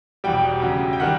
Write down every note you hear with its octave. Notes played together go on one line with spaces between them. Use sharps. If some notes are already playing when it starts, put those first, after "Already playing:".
E1 E2 B2 G3 G5
D2 C#3 F#3
G5
D#3 G3 F#5